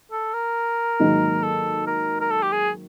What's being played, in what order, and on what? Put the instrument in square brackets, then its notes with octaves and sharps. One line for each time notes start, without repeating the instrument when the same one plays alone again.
[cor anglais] A4
A#4
[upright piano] G#2 D#3 F#3 A#3 D#4
[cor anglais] A4
A#4
A#4
A4
G4
G#4